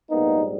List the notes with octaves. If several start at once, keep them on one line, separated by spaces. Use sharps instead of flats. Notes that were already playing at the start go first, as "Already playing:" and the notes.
A#1 G#2 G3 A#3 B3 D#4